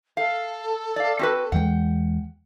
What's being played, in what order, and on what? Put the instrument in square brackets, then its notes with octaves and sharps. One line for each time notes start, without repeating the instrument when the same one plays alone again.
[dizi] A4 [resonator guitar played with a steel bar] F5
[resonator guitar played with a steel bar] D5 F5
C4 F#4 B4
[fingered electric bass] E2 E3 G#3 [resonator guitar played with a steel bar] F#5 G5